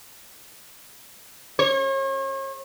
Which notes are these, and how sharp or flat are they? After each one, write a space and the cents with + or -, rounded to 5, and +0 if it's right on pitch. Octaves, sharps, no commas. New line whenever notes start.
C#5 -40